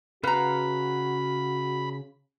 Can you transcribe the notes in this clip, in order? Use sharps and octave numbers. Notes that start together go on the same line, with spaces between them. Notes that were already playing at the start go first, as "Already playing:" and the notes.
C#3 F#4 B4 F5 F#5 A#5 B5